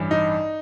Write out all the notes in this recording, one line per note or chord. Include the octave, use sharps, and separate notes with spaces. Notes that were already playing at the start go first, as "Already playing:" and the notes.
Already playing: A1 G2 E3
D#4